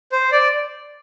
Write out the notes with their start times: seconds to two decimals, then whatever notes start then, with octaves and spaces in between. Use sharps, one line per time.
0.12 C5
0.32 D5